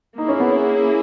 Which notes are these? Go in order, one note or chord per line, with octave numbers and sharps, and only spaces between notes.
A#3 D#4 E4 G#4
C#4
B3
C#4